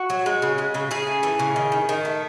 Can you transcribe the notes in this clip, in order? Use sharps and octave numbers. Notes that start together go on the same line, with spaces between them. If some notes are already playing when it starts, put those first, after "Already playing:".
Already playing: F#4
F#3
G#3
C#3
G#3
C#3
C#3 G#4
A3
E3
C#3
D#3
D#3
D#3
A3